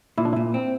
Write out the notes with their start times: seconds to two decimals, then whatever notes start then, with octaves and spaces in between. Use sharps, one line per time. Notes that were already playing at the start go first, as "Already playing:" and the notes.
0.18 A#2 E4
0.25 D4
0.33 A#2 E4
0.54 C4